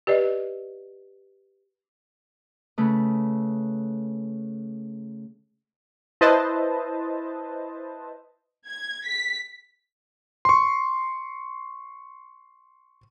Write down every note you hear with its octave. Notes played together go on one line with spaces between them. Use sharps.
G4 B4 D5 D#5
C#3 A3 B4
E4 B4 C5 D#5 A5
G#6
B6
C6 C#6